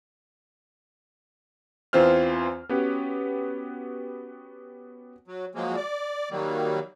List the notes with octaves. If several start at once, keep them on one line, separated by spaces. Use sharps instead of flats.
E2 E3 C4 F4 C5 F6
B3 C#4 F#4 G4 B4 F#5
F#3
F3 F#3 G#3 A#3
D5
D#3 F#3 G3 A#3